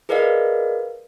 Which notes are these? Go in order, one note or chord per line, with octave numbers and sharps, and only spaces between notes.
G#4 A#4 B4 D5 D#5 F5